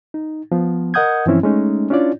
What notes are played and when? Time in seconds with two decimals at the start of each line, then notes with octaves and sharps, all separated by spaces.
0.14 D#4
0.52 F3 B3
0.94 A#4 D#5 F#5 D#6 G6 G#6
1.26 G2 E3 F3 C4 C#4 E4
1.43 G#3 A3 C#4 D#4
1.90 C#4 D4 E4 F4 C#5 D5